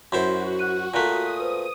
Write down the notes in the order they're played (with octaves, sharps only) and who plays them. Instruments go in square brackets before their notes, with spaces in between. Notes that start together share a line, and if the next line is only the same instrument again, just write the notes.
[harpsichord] F#2 E4 C5 [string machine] F#4 [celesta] C6
[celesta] F#6 D#7
[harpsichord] A#2 A3 [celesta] A#5 F#6 B6 [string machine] D#6
[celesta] B4 C5